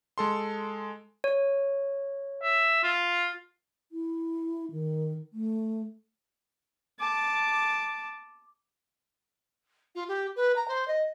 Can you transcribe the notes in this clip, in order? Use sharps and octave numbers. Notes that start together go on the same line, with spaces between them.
G#3 A4 C6
C#5
E5
F4
E4
D#3
A3
A5 D6
F4
G4
B4
A#5
C5
D#5